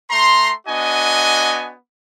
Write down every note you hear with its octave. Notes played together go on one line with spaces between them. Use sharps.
A3 A#5 C6
B3 D4 F#4 D#5 G#5